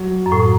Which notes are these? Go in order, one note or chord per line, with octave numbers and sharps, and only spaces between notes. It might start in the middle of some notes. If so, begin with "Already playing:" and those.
Already playing: F#3
F#2
A2